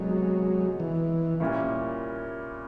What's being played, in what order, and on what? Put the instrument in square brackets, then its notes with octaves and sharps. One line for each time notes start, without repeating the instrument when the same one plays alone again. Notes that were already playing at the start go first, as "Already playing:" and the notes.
Already playing: [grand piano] C3 B3 D#4 [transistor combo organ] F#3 G#3
[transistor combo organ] E3
[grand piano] A#2 G3 A#3 C#4 E4